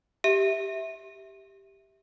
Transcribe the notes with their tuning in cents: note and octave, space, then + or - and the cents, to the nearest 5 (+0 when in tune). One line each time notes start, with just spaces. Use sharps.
G4 +0 E5 -15